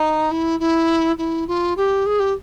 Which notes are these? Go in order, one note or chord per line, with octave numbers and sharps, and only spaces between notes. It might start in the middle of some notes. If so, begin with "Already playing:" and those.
Already playing: D#4
E4
E4
E4
F4
G4
G#4
G4